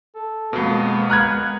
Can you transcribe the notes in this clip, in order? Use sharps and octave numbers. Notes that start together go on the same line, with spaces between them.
A4
F2 B2 G#3 A#3 B3
A#5 B5 F6 F#6 G#6